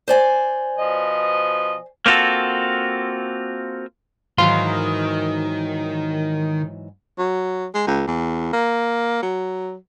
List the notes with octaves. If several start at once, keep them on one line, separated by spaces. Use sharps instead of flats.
C5 D5 G#5
B2 F3 D#5
A#3 C4 F4 F#4 A4
G#2 D#3 E3 F#3 F5 C6
F#3
G#3
C#2
E2
A#3
F#3